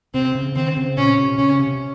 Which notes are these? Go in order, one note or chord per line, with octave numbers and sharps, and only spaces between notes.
C3 C4
C#3
D#3 C4
C#3
A#2 C#4
C3
C#3 C#4
C3